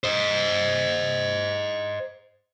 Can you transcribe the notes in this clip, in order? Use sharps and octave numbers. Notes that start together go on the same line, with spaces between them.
C5 D#5